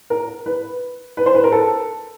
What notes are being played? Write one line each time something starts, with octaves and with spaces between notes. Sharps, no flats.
A#4
B4
B4
C5
B4
A#4
A4